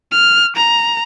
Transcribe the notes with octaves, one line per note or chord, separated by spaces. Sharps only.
F6
A#5